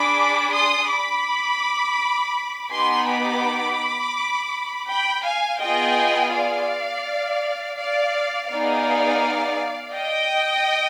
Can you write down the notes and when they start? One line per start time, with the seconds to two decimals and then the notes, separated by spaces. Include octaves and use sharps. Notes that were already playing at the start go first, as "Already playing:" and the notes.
Already playing: D4 G#4 B5 D6
0.55 C6 D#6
0.91 B5 D6
2.72 B3 D#4 G4 G#5 C6
3.08 B5 D6
4.89 G5 B5
5.25 F5 G#5
5.61 B3 F4 G#4 D#5 G5
6.34 D5 F5
7.78 D5 F5
8.50 B3 D#4 G#4 D5 F5
9.95 D#5 G5